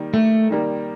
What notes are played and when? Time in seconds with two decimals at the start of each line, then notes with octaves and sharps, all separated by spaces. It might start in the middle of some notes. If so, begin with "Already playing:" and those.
Already playing: D#3 G3 A#3
0.14 A3
0.50 D#3 G3 A#3